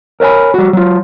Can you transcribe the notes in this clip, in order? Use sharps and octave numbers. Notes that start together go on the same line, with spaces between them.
A#4 C#5 F5 G#5 B5
G3 F#4
F#3 F4